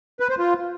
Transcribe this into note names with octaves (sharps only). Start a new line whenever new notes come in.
B4
C5
F4